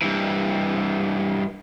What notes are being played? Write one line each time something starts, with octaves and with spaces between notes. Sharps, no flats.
G2 E3